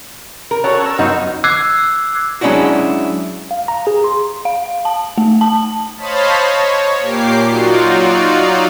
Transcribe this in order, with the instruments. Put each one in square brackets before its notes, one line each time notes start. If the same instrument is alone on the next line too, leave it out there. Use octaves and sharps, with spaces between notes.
[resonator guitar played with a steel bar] A#4
[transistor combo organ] C#4 F#4 A4 [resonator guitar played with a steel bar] C#5
[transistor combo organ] A#4 E6
[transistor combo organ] F#2 B3 F4 [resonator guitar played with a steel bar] D#4 F#4
[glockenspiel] D6 E6 F#6 G#6 C7
[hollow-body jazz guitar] F#3 G#3 C#4 D4 E4 F#4
[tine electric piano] F5
A#5
G#4
C6
[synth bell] F5
A5
A3
A5
[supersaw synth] C5 C#5 D#5 F5 A5 B5
C#5
A#2 A#3 G4 D6 C7
F#3 D#4 F4 F#4 D5